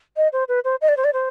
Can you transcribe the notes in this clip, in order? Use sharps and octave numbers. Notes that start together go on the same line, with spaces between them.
D#5
C5
B4
C5
D#5
D5
C5
D5
C5